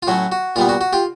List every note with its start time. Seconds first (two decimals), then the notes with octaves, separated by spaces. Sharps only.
0.03 F4
0.07 A2 F#3 A3 C#4 F#4
0.32 F#4
0.56 A#2 G3 B3 F4
0.69 F#4
0.81 F#4
0.93 F4 G4